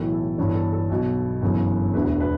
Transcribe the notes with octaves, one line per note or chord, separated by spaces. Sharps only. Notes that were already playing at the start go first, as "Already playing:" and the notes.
Already playing: B1 A2 E3
A4
G1 G2 E3 C#5
A4
A4
B1 B2
G1 F#2 C#3 E3
E1 D2 D3 B4
B4